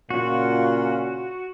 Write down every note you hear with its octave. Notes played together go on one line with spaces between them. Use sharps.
A#2 C#3 C#4 F4 F#4